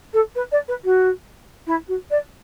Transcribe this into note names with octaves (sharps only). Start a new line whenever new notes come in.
A4
B4
D5
B4
F#4
E4
F#4
D5